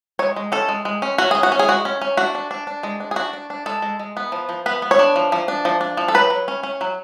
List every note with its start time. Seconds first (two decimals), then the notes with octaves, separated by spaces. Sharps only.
0.19 G#3 C#5
0.36 G#3
0.52 C#4 A4
0.68 G#3
0.85 G#3
1.02 C#4
1.18 C#4 F#4
1.31 C#4 G#4
1.43 F#4
1.52 C#4
1.59 G#4
1.68 G#3 F#4
1.85 C#4
2.01 C#4
2.17 D4 F#4
2.35 D4
2.51 D4
2.67 D4
2.83 G#3
3.00 D4
3.11 G#4
3.16 D4 F#4
3.33 D4
3.50 D4
3.66 G#3 A4
3.82 G#3
4.00 G#3
4.17 B3
4.32 F3
4.49 F3
4.66 B3 B4
4.82 B3
4.91 C#5
4.99 D4
5.16 F3
5.32 F3
5.48 D4
5.65 F3
5.81 D4
5.97 F3
6.08 A4
6.14 F#3 B4
6.30 F#3
6.48 C#4
6.63 C#4
6.81 F#3